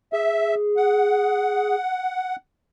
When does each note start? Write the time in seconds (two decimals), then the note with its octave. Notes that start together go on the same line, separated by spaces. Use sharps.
0.13 G#4 E5
0.77 F#5